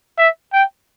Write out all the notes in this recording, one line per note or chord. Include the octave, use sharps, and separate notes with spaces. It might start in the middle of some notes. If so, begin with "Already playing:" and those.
E5
G5